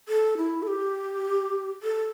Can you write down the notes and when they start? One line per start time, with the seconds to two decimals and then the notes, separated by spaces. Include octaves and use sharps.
0.08 A4
0.37 E4
0.62 A4
0.67 G4
1.83 A4